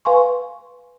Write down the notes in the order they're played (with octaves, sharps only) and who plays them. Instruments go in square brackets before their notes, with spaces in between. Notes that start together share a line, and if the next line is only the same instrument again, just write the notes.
[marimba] B4 F5 G#5 C6 C#6